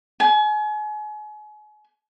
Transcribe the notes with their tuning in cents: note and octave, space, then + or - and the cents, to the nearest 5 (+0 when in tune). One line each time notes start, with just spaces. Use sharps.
G#5 +35